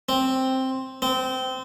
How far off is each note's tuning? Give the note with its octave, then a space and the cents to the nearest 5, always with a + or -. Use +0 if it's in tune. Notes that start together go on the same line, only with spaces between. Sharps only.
C4 +5
C4 -20